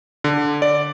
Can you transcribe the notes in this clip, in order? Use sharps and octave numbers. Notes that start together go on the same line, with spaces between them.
D3
D5